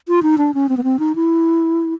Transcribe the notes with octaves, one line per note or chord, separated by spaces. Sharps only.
F4
D#4
D4
C#4
C4
B3
C4
D#4
E4